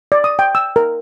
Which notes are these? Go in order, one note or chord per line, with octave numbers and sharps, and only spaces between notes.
D5
D#6
G5
E6
A#4